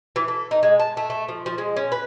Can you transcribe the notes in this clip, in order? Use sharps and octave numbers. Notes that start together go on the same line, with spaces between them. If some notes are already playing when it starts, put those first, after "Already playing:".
E3
A4
D#4
G#3
A5
A3
A3
F3
F3
G#3
C#4
B4